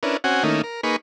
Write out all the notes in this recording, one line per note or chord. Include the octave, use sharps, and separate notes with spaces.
C#4 D4 E4 A#4 B4
C4 C#4 F#4 F#5 G#5
D#3 A3 A#3 C#4 D#4 E4
A#4
A#3 D#4 G#4 B4 B5 C#6